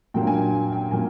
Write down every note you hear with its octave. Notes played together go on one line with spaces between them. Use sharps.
A#2 F#3 A#3 D4 G5
G#5
G5
G5
A#2 F#3 A#3 G#5